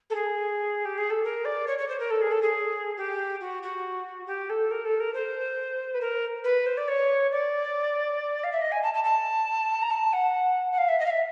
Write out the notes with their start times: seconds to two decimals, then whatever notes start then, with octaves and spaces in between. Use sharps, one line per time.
0.10 A4
0.14 G#4
0.85 G4
0.97 G#4
1.10 A4
1.23 A#4
1.45 D5
1.66 C#5
1.78 C#5
1.88 C5
1.99 A#4
2.10 A4
2.21 G#4
2.31 A4
2.42 G#4
2.97 G4
3.40 F#4
3.62 F#4
4.26 G4
4.49 A4
4.70 A#4
4.84 A4
4.99 A#4
5.14 C5
5.94 B4
6.00 A#4
6.44 B4
6.66 C5
6.77 D5
6.88 C#5
7.31 D5
8.43 F5
8.52 E5
8.61 D#5
8.71 G#5
8.82 A5
8.93 A5
9.03 A5
9.82 A#5
9.90 A5
10.12 F#5
10.72 F#5
10.78 F5
10.88 E5
10.99 D#5
11.05 F5
11.10 E5